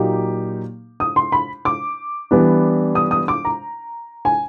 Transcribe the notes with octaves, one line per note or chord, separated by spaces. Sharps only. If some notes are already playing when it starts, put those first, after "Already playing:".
Already playing: A#2 F#3 A#3 D#4 G4
D#6
C6
B5
D6
E3 G3 B3 D4
D#6
D#6
D6
A#5
G#5